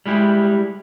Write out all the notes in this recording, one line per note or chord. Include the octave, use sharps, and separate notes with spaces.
G3 G#3 E4 G4